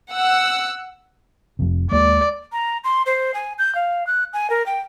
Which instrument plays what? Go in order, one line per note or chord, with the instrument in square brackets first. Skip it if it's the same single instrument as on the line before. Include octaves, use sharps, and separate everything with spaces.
[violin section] F#5 E6
[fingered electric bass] F1 F2 C3
[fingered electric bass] D#2 G#3 A#3 [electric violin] D5
[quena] A#5
C6
C5
G#5
G6
F5
F#6
G#5
A#4
G5